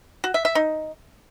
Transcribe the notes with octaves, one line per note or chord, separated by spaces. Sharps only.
F#4
E5
E5
D#4